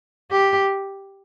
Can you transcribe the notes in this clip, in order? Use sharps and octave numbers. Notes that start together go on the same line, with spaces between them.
G4